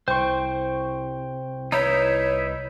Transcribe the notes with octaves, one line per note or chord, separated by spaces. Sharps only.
C2 C5 G5 C6 C#6
D#4 E4 B4 C#5 G6